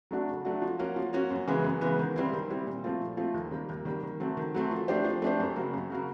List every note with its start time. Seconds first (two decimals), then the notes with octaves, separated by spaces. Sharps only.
0.11 F#3 A3 D4 F#4
0.28 C#3
0.45 F#3 A3 D4 F#4
0.62 F3
0.79 A#3 C#4 F#4
0.96 F3
1.13 A#3 C#4 F#4
1.31 F#2
1.47 C#3 E3 G#3 B3
1.64 F#2
1.81 C#3 E3 G#3 B3
1.99 D#3
2.16 G3 C4 E4
2.33 D#3
2.50 G3 C4 E4
2.67 A#2
2.84 F3 A3 C4 F4
3.01 A#2
3.17 F3 A3 C4 F4
3.34 D#2
3.51 D#3 G3 A#3
3.69 D#2
3.85 D#3 G3 A#3
4.03 D#3
4.20 F#3 A3 C4
4.37 D#3
4.54 F#3 A3 C4
4.71 F3
4.88 A3 D4 G4 C5
5.04 F3
5.22 A3 D4 G4 C5
5.40 F#2
5.56 C#3 F#3 A#3
5.73 F#2
5.90 C#3 F#3 A#3